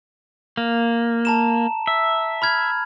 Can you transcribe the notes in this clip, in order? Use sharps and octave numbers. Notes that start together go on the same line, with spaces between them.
A#3
A5 A#5 E7
E5
B5 F6 G#6